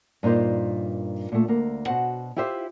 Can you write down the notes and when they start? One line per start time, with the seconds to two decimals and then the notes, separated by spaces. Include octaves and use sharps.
0.23 G2 A#2 D#4 C5
1.32 A#2 A3
1.48 D2 A#3
1.86 B2 F#4 C5 F#5
2.36 E4 F4 G4 C5 E5